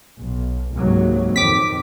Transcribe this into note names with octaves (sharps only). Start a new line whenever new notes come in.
B1
C#2 G#2 C3 F#3 A#3
A#1 F2 D#3 C4 D6 B6